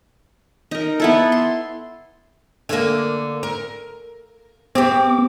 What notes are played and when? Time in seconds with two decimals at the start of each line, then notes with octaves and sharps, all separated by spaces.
0.71 D#4 A#4
1.00 B3 E4 A4
1.32 C6
2.69 D3 A#3
3.43 A#4
4.75 B3 C4 G4 D6